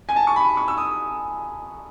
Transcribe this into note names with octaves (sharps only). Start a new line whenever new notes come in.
G#5
A5
C#6
B5
C#6
E6
D#6